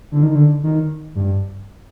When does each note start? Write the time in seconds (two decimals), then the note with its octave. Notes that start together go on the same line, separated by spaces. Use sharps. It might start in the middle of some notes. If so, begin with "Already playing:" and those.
0.12 D3
0.23 D#3
0.35 D3
0.63 D#3
1.15 G2